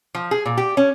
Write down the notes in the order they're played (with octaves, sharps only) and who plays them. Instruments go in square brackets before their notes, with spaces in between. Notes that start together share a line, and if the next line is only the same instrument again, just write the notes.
[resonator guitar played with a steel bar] F3
G#4
A#2
G4
C#4